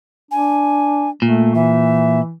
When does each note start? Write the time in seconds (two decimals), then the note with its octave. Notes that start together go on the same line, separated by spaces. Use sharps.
0.31 D4 G#5
1.22 A#2 A3
1.55 E3 E5